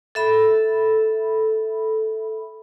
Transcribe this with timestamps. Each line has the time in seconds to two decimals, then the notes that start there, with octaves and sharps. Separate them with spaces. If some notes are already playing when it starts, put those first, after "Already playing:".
0.15 A4 E5 B5